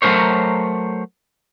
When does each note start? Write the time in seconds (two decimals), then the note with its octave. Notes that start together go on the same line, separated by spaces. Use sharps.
0.02 F#3 A3 F4 A#4 C5 C#5